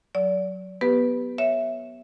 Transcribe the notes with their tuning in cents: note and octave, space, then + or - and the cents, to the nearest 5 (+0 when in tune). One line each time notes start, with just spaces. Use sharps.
F#3 +0 D5 -30
B3 -10 G4 +0 B4 +0
C#5 -15 E5 +0